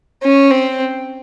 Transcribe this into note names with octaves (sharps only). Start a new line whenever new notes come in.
C#4
C4